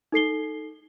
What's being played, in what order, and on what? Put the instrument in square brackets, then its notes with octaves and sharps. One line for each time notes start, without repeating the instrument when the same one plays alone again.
[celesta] D#4 A4 C7 G7